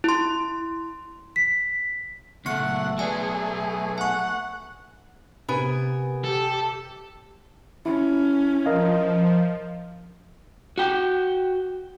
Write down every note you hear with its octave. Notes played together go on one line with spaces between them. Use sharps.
E4 C6
B6
C#2 F#3 A3 B3 F#5 C#6 C#7
F#3 B3 G#4 D5 G#5
F#5 G#5 C#6
C3 B3 A#4 G#5
G4 A4
C#4 E4
F3 A#4 D#5 F5
F#4 G5